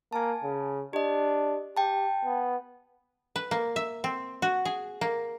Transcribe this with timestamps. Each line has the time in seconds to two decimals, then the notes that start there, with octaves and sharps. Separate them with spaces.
0.13 A#3 G#5 A5
0.43 C#3
0.93 D4 G4 D#5
1.77 G4 G5 A5
2.25 B3
3.36 B4
3.51 A#3
3.76 E5
4.04 C4
4.42 F#4
4.65 G#4
5.01 A#3